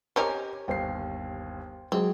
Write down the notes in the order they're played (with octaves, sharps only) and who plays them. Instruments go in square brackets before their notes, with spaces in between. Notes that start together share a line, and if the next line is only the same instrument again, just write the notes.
[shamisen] C4 C#4 A#4 [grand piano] G4 D#5 [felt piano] C#5
[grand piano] G1 D#2 C7 [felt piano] C5 G5
[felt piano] F#3 G#3 G#4 [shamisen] C4